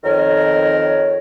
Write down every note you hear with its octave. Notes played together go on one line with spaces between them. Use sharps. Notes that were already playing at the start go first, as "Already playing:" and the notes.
F2 D#3 A#4 C#5